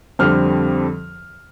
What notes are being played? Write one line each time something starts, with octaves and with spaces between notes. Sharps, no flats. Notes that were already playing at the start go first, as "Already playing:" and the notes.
F2 D3 G3 C4 F6